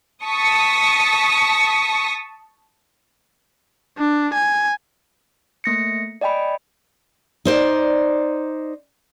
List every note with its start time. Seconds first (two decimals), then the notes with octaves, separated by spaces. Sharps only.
0.24 A5 C#6 D#6 B6
3.98 D4
4.34 G#5
5.64 A3 A#3 A#6 C#7
6.21 D5 D#5 G5 G#5 B5
7.45 D#4 C5 D5